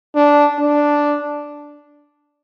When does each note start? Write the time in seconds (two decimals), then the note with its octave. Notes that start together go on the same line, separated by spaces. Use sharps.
0.15 D4
0.59 D4